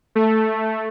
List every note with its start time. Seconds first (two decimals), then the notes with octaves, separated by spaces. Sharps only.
0.15 A3